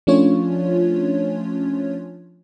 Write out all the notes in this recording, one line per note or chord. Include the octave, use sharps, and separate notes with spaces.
F3 A3 C#4 D4 F4 C#5